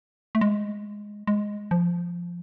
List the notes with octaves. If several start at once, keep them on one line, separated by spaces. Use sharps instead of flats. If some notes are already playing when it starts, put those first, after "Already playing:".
A3
G#3
G#3
F3